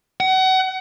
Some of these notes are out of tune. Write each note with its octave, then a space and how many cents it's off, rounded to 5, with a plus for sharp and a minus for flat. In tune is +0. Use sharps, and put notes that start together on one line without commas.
F#5 +30